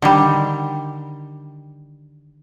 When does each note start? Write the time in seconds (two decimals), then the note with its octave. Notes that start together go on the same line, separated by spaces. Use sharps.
0.02 D3 D#3 G3